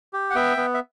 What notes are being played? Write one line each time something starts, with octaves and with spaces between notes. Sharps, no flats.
G4
F#5
B3 E5 G5
B3
E5